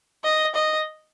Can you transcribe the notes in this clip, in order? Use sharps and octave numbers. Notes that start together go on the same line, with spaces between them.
D#5
D#5